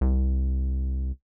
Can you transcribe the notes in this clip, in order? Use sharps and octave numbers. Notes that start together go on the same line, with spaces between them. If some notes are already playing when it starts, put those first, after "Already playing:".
C2